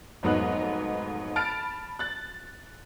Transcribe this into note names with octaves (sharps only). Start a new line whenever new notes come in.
F1 G#2 F#3 B3 D#5 F#6
A5 B5 F6 A6 D7
F#6 A6